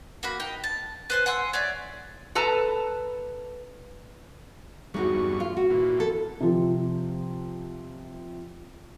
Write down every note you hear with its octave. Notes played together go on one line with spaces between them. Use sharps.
A#3 F#4 B5
D#4 G5
A5
B4 C5 G#5
F#5 G#5 C6 E6
C#5 D5 E5
A4 B4 A5 A#5
E2 G2 G#3 D#4 F#4 C#6
F4
F#4
A#2 E3
A4
C3 F3